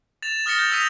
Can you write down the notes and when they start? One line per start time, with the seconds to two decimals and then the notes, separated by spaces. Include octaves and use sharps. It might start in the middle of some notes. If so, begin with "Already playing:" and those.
0.22 A6 E7 F7
0.46 D#6 F6 A6 A#6 C#7 G7
0.59 G6 F7
0.71 D#6 E6 A#6 B6 D#7 F7